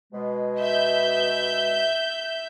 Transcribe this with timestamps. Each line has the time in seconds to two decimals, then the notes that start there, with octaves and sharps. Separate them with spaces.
0.12 B2 G#3
0.59 E5 G6